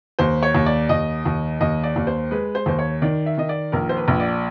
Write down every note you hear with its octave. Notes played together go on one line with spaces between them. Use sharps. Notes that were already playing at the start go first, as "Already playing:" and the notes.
D#2 C5
C#5
D#2
D5
D#2 D#5
D#2
D#2 D#5
D5
D#2
C5
G#3 B4
C5
D#2 C5
C#5
D#3 D5
E5
D#3 D#5
D5
A#1 A#4
C5
B4
A#1
D5